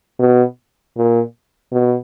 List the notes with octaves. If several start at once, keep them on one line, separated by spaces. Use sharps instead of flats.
B2
A#2
B2